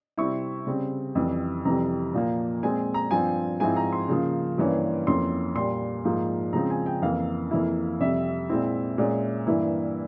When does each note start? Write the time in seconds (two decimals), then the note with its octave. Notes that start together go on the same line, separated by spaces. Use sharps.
0.18 C3 G3 C4 E4 C#6
0.67 C#3 G3 C4
1.15 F2 E3 G3
1.65 F2 C3 E3 G3 A#5
2.13 A#2 F3 A#3
2.63 A#2 G#3 C4 G#5
2.94 A#5
3.11 G2 F3 C4 G#5
3.60 G#2 F3 C4 E4 G#5
3.77 A#5
3.93 C6
4.09 C#3 F3 A#3
4.58 G2 E3 A#3 C#4
5.06 F2 E3 A#3 C#4 C6
5.55 A#2 G3 A#3 C6
6.04 G#2 F3 A#3
6.53 C#3 F3 G#3 C4 A#5
6.70 G#5
6.86 G5
7.02 F2 E3 A#3 F5
7.51 F2 E3 A#3 E4
8.00 F2 C3 G3 E5
8.49 A#2 G#3 C4 E4
8.98 A#2 G#3 C#4
9.47 G2 E3 A#3 E4